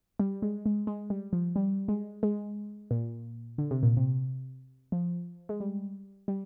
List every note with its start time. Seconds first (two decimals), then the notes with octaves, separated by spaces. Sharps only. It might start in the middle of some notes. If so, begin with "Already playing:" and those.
0.19 G3
0.42 G#3
0.66 G#3
0.87 G#3
1.10 G3
1.33 F3
1.56 G3
1.88 G#3
2.23 G#3
2.91 A#2
3.58 D3
3.71 C3
3.83 A#2
3.97 C3
4.92 F3
5.49 G#3
5.60 G3
6.28 G3